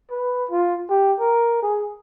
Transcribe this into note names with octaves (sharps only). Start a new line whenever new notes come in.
B4
F4
G4
A#4
G#4